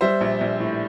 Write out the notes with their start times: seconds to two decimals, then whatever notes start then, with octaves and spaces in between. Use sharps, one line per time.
0.01 G3 C5 E5
0.21 A#1
0.41 A#1
0.60 A2